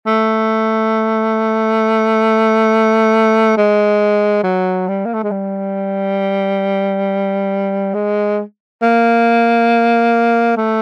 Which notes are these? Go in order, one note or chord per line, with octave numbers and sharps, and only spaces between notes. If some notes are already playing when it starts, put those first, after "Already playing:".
A3
G#3
F#3
G3
A#3
A3
G#3
G3
G#3
A#3
A3